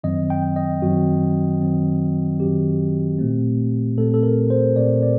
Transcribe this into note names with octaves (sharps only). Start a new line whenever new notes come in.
F#2 D#3 F#3 C4 D#5
G5
D#5
F#2 D#3 F#3 C4 F#4
F#2 D#3 F#3 C4
F#2 D#3 F#3 C4 G4
A#2 A3 C4
A#2 A3 C4 A4
A4
A#4
C5
A#2 A3 C4 D5
D5